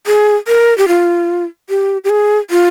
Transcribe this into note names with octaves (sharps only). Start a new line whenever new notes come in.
G#4
A#4
G4
F4
G4
G4
G#4
F4